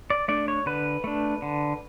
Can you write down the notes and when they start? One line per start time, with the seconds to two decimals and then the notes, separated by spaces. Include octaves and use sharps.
0.10 D5
0.28 A3 D4 D5
0.48 C#5
0.66 D3 B4
1.04 A3 D4
1.42 D3